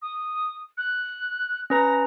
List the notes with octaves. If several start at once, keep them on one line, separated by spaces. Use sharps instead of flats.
D#6
F#6
C#4 B4 A#5 A#6